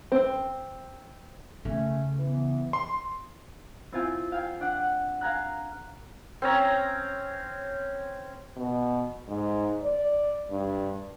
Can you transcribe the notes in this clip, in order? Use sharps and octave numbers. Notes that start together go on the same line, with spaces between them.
C4
C#3 A3 C#4
E3 B3
C6
C4 E4 F4 G#5 G6
F5 G5 G#5
D4 F#5
F5 G#5 A#5 F#6
C4 C#4 A#5
B2
G#2
D5
G2